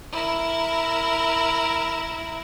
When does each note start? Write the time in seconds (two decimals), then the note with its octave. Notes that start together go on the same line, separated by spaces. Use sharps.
0.12 E4 A#4